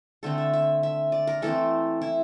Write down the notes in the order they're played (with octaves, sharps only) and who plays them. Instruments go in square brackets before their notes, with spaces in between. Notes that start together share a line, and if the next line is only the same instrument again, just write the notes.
[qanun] D3 A3 C4 A4
E5
E5
E5
D5
A#4
E3 A3 C4 A4
E4